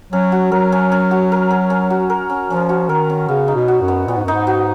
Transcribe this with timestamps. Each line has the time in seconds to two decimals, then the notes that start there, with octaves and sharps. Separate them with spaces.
0.12 F#3 C#4
0.32 F#4
0.52 F#3 A#4
0.72 C#4
0.92 C#4
1.11 F#4
1.32 A#4
1.51 C#4
1.70 C#4
1.90 F#4
2.10 A#4
2.30 C#4
2.50 F3 C#4
2.69 F#4
2.89 D#3 A#4
3.09 C#4
3.28 C#3 B3
3.48 D#4
3.55 B2
3.68 F#4
3.82 F#2
3.88 B3
4.07 A#2 B3
4.16 G#2
4.24 F#2
4.28 D#4
4.33 G#2
4.47 F#4